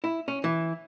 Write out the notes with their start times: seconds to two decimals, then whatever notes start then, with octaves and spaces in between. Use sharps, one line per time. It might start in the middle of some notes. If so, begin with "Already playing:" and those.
0.04 E4
0.28 C#4
0.44 E3